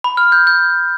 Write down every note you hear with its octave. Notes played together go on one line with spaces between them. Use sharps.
B5
F6
G6
G6